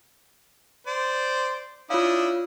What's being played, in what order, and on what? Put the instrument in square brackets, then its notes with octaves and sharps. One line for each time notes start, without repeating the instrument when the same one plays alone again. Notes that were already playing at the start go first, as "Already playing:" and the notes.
[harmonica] C5 D5
[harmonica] D4 E4 D#6 [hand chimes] F4 C#5 F5